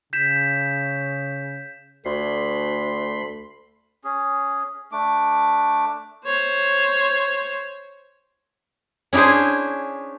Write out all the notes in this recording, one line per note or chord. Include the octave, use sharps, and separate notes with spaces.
C#3 G6 B6 E7
D2 A3 B5 C6
C#4 G#4
A3 D4 D6
C5 C#5
C#4 D4 E4 G#4 C5